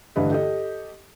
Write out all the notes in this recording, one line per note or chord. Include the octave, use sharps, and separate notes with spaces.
A1 G2 D3 E3 B4 D#5
G4 A4 D#5